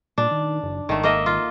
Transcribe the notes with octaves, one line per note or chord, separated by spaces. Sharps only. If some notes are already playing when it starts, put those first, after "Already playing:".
A#2 D4
D#3
F#1
G#1 D#3 A3
A#3 D#5 E5
F4